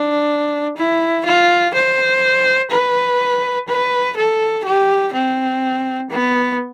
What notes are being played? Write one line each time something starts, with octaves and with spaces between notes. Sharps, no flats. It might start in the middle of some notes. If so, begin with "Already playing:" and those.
Already playing: D4
E4
F4
C5
B4
B4
A4
G4
C4
B3